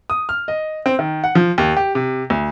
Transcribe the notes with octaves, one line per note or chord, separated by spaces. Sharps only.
D#6
F6
D#5
C4
D#3
F#5
F3
D#2
G4
C3
D2